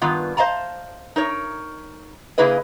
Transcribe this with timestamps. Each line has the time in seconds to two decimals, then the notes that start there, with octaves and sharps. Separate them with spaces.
0.02 G2 D#3 B3 F4
0.37 C5 D#5 F5 A5 A#5
1.16 D#4 A#4 C#5
2.38 C#3 A#3 E4 G#4 B4 D#5